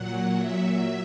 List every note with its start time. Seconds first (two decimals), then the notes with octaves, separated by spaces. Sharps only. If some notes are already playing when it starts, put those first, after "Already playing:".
Already playing: A#2 F#3 F#5
0.36 E5